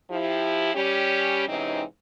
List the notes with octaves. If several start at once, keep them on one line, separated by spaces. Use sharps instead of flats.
F3 E4 G4
G3 C#4 G4
G#2 C3 E3 C4 C#4 D#4